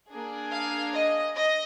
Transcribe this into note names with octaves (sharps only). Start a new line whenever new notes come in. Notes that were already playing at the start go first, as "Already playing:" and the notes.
A#3 D4 G#4
F5
D#5
D#5